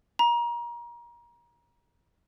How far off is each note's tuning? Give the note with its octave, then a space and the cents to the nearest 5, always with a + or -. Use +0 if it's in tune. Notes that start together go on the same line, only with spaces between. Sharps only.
A#5 +30